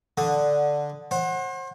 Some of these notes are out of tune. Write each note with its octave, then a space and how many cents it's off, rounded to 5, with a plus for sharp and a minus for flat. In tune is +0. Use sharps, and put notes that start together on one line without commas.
D3 +0 F#5 +0 D#6 +0
C5 +35 F#5 +0